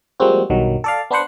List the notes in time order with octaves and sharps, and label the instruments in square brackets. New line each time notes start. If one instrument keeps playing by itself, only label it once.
[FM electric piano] F3 G3 G#3 A#3 C4 F#4
B1 G2 D#3 F#3
A4 D5 F5
B3 D4 B4 C5 F#5